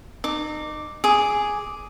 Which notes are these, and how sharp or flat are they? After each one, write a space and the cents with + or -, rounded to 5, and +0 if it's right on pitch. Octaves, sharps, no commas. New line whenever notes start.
D#4 -35 D6 +0
G#4 +0 D6 +0